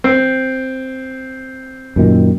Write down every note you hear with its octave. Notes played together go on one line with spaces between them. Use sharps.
C4
F#2 A#2 D#3